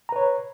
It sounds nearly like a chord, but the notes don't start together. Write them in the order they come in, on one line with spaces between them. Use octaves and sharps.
A#5 B4 C#5